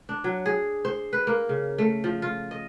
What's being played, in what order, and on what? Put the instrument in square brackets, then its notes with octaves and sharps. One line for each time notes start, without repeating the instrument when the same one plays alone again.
[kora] D4
F#3
G#4
C5
B4
A#3
C#3
A3
F3
F4
D#5